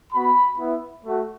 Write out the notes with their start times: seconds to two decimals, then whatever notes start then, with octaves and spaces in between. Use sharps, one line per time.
0.13 B3 F#4 B5
0.59 B3 E4
1.05 A3 F#4